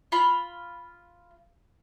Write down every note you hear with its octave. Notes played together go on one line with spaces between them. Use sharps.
F4 B5